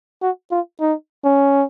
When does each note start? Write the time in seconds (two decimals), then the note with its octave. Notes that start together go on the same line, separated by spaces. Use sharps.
0.22 F#4
0.51 F4
0.81 D#4
1.25 C#4